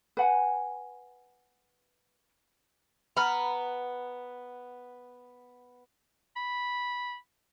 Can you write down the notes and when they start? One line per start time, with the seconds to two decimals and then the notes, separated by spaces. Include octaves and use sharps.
0.17 B4 F#5 G#5
3.17 B3 A#5 B5 F6
6.36 B5